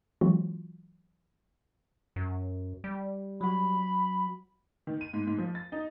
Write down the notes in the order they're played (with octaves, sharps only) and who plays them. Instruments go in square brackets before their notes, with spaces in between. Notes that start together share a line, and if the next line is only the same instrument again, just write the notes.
[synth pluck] E3 F#3 G#3 C4 F4 F#4
[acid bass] F#2
G3
[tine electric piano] F#3 F#4 [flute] B5
[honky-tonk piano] D#3
D#7
G#2
G#2
F3
A6
D#4